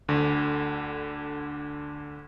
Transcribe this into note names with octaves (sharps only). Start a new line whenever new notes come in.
D2 D3